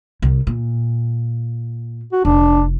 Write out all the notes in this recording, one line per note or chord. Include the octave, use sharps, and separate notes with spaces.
C2
A#2
F#4
F1 D4